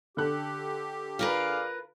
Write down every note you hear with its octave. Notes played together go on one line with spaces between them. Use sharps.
D3 G4 A4 F#6
F4 G#4 A#4 B4 D5 F5